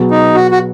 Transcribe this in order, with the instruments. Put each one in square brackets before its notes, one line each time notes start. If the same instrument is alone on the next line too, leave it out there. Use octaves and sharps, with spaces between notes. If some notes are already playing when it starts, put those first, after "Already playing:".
Already playing: [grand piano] B2 F#3 B3 G#4
[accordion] D#4
F#4
F#4